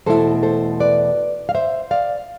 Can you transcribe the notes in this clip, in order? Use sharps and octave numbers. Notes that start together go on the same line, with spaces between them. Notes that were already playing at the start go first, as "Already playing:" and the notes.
E2 B2 A3 E4 A4 C5
A4 C5
B4 D5
F5
C5 E5
D5 F5